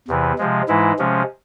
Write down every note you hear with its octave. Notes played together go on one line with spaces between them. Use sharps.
E2 C3 E3
C3 F3 G#3
G#2 E3 G#3 E4
C3 F3 G#3 C#4